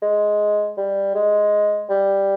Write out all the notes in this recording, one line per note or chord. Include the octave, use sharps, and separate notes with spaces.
G#3
G3
G#3
G3